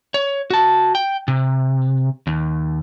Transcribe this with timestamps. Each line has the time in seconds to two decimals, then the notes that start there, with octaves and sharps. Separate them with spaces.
0.14 C#5
0.50 F#4 A5
0.95 G5
1.28 C3
2.27 D#2